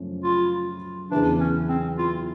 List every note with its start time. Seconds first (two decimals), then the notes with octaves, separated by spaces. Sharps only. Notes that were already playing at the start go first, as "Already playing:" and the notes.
Already playing: F#2 C#3 F3 A3 C#4
0.24 F4
1.11 E2 C#3 E3 D4
1.40 C#4
1.69 C4
1.98 F4